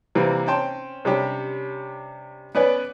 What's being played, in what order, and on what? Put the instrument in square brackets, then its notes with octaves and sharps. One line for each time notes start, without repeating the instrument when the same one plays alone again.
[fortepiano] C3 E3 G3 A#3 C4
C4 C#4 G5 A5 C6
C3 G3 C#4 D4 G4
B3 C#4 B4 D5 G#5